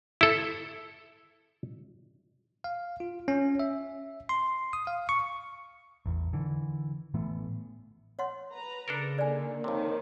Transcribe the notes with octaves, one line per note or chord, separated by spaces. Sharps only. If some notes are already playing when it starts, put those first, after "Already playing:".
E4 A4
F5
F4
C#4
E5
C6
D#6
F5
C#6
A1 E2
D3 E3
A2 E3 A3 B3
C#5 F#5 C6
B4 A#5
C#3 D4 A4 A#4
D3 D#3 A#3 D5 G#5
F2 C3 D#3 C#5